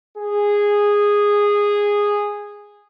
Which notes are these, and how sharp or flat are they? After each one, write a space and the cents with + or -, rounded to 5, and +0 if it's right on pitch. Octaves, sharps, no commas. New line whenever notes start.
G#4 -10